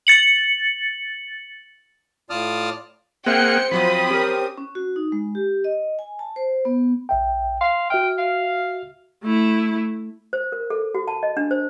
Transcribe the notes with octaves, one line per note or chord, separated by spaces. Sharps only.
A6 C#7 F#7
A2 F4 D5 A5 D#6 F6
A#3 C4 G#4 C5 E5 F#5 G5 C#7
F3 F#3 C4 F4 B5 D#6
C#4 G4 A#4
C#4
F#4
D#4
G#3
G4
D#5
G#5
A5
C5
B3
A#1 E5 G5
F5 C6
F#4 E5 G5 F6
F5
A3 E4
C5
A#4
A4
F#4
A5
D#5
D4
C5